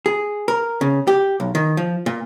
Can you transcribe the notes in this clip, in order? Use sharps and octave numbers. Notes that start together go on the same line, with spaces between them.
G#4
A#4
C#3
G4
B1
D#3
F3
A#2